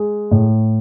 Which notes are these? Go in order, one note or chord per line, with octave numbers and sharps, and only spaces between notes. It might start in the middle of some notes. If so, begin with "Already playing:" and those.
Already playing: G#3
A2